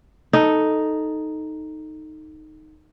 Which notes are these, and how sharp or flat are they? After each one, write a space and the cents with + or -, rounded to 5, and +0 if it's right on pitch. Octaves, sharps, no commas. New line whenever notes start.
D#4 +0 A4 +0